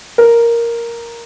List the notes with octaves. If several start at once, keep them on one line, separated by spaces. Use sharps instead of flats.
A#4